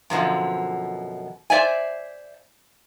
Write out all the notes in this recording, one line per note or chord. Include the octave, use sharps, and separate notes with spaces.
F#2 B2 D3 F3
C5 D5 E5 G#5